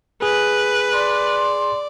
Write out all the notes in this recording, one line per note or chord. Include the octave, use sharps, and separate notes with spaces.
G#4 B4
D5 C6